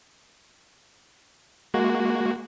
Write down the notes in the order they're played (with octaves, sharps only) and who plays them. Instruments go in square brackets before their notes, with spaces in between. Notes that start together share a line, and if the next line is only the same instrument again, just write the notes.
[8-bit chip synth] G#3 A#3 F#4